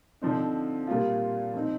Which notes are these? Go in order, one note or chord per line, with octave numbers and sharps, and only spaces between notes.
D3 F3 C4 D#4
A#2 G3 A#3 F4
F3 C4 D#4